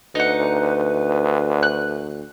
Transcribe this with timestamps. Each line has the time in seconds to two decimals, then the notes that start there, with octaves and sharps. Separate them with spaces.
0.15 D2 D#4 B4 F#5
1.63 F#6